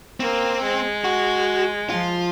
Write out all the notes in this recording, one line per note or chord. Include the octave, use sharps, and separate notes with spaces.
A#3 C4
G#3
F#4
F3 F4